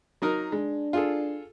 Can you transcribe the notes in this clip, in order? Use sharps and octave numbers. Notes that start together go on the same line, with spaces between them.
F#3 D#4 A#4
G#3 D4
F4 G#4 A4